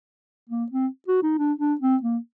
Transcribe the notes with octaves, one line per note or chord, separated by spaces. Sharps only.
A#3
C4
F#4
D#4
D4
D4
C4
A#3